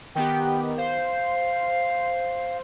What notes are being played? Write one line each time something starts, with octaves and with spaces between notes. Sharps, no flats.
D#3 B3 G4 G5
C5 F5